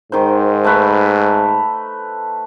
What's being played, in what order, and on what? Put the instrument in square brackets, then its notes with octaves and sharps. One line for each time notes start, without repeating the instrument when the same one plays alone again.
[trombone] G#2 [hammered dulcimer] D#3 C5
[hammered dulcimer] A3 B4